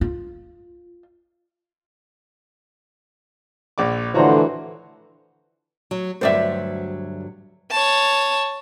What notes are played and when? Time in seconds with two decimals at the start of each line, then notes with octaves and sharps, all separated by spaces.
0.01 F4
3.78 A#1 D5 D6
4.15 A2 D3 E3 F3 F#4 C5 C#5 A#5
5.91 F#3
6.21 D2 G2 F#3 C5 D5 E5
7.71 C#5 A5